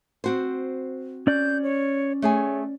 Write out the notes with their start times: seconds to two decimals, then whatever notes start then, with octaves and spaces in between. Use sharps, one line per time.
0.24 C4 F#4 C5
1.27 C#4 D5 G6
1.63 C#5
2.22 A3 G#4 C#5 G#5